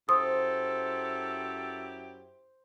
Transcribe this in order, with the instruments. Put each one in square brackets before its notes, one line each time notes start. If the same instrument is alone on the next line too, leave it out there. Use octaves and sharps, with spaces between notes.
[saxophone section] F#2 E4 G4 [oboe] A4 [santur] C5 [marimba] D#6